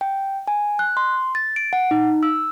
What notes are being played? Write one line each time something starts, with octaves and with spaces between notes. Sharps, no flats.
G5
G#5
F#6
C6
A6
D7
F#5
D#4
E6